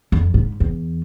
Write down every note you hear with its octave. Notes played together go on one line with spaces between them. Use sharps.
F2
G#2
E2